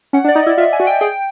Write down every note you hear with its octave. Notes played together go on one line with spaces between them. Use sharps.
C#4 F#5
D4
D5
D#4
E4 D#5
F4 E5
G#5
F#4
G5
G#4 G5